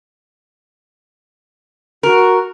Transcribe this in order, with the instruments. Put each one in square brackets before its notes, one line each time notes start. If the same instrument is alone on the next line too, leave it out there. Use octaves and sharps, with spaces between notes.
[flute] F#4 [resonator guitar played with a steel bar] A#4